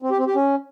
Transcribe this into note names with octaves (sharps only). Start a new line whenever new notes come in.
C4
G4
C4
G4
C#4